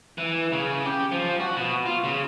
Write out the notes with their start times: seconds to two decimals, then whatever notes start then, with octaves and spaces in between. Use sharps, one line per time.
0.18 E3
0.52 C#3
0.85 G4
1.12 F3
1.41 F#4
1.57 B2
1.86 F4
2.04 C#3